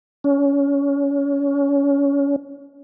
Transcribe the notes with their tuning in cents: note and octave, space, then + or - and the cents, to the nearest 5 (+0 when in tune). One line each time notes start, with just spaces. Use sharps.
C#4 +25